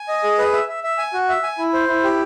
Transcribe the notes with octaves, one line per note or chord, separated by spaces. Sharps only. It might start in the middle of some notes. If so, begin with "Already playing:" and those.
Already playing: G#5
D#5
G#4
B4
E5
E5
E5
G#5
F#4
E5
G#5
E4
C5
E4
G4